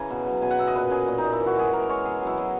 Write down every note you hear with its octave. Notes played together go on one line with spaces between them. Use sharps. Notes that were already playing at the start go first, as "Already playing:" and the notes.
Already playing: C#3 E3 G#5 A#5
B2
F#3
B2 G#5
F#5
B2 E5
D#5
A#2 B4
C#4 G#4
A#2
D#4
A#2
E4
E3
F#4
G#3 G#4
E3 A#4
G#3 C#5
B2 G#4
F#3
E4
F#3 D#5